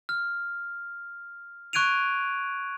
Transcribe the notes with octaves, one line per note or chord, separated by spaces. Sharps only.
F6
C#6 F#6 G#6 D7 D#7 F7